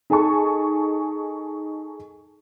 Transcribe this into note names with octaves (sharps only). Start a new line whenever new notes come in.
D#4 G#4 A4 G#5 A5 C#6